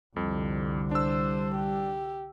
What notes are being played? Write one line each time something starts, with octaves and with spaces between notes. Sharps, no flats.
C2 F2 D3 G3
D4 C5 E6
G4